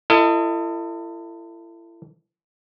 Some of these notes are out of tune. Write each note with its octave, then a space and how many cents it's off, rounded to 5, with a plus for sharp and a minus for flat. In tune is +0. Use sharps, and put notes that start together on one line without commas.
E4 +35 A4 +35 D#5 +0